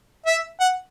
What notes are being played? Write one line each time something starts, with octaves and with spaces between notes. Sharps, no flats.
E5
F#5